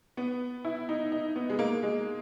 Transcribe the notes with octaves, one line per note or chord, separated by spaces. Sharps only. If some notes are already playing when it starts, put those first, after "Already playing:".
B3
E4
D#4
D#4
B3
G#3
A#3
G#3